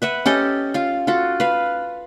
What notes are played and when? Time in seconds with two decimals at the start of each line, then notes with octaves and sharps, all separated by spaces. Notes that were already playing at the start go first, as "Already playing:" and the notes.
0.02 B4 E5 F#5
0.26 C#4 G4 A4 D#5
0.74 F4 F5
1.07 F4 F#4 A4
1.40 B4 F5